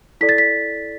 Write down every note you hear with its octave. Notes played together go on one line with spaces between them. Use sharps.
E4 A4 D5 B6
A6
B6